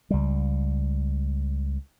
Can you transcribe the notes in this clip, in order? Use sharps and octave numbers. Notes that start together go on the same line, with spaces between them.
C#2 G3